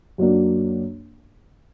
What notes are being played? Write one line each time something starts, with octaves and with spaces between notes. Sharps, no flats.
F#2 F#3 A#3 D4